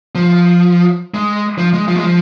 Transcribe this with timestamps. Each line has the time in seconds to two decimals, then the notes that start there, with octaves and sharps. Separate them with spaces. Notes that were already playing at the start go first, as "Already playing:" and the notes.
0.15 F3
1.14 G#3
1.58 F3
1.73 G#3
1.88 F3
1.96 G#3
2.03 F3